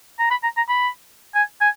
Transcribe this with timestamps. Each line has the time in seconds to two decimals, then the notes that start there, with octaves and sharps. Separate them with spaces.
0.19 A#5
0.31 B5
0.43 A#5
0.57 A#5
0.69 B5
1.35 G#5
1.61 G#5